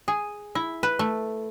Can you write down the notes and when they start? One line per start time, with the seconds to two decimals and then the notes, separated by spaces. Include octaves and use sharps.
0.08 G#4
0.55 E4
0.83 B4
0.99 A3